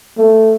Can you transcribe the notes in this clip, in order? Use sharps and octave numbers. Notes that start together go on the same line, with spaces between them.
A3